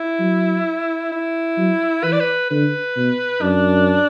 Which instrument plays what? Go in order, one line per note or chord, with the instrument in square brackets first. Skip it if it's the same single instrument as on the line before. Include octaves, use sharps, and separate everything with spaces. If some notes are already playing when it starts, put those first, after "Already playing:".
Already playing: [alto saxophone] E4
[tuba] F#3
[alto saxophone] E4
[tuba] F#3
[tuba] E3 [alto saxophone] B4
[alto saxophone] D5
B4
[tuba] D3 [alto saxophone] B4
[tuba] B2
[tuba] F#2 [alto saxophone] D4